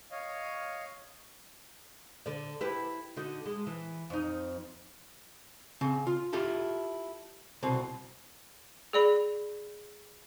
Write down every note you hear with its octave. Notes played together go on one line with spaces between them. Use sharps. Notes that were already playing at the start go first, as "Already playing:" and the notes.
C#5 D#5 F5
D3 D5
E4 G4 B4
D3 D#4 F#4
G#3
E3
F2 D#4
C#3 C4
F4
E4 F4 G4 A4
C2 B2 C4
G#4 D5 B5